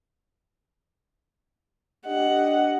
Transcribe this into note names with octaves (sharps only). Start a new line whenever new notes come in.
D4 G4 D#5 F#5